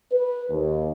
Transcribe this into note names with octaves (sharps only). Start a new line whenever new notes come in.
B4
D#2